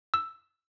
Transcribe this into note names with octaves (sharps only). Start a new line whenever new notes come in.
E6